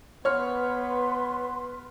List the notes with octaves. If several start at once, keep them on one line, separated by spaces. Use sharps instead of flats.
B3 B4 C#5 C6 F6